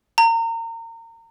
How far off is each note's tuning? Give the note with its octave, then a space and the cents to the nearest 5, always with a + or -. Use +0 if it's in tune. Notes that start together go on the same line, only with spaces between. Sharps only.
A#5 -30